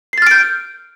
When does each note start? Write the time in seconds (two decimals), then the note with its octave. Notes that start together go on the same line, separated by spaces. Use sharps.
0.13 C7
0.18 A6
0.22 F6
0.27 D7
0.31 G6